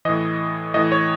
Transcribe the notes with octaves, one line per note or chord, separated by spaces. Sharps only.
A2 E3 D#5
A2 E3 D#5
C#5